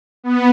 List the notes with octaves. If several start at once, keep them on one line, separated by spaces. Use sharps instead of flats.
B3